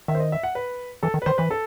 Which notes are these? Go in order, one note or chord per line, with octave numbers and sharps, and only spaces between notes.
D#3 E5
C5
D#5
E5
F#5
B4
E3 A4
D#3
B4
D#3 C5
E3 B4
A4